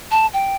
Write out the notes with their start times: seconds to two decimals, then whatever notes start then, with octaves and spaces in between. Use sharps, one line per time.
0.11 A5
0.34 G5